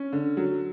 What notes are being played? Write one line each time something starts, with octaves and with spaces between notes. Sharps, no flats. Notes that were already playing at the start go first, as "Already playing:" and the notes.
Already playing: C#4
D3
F#3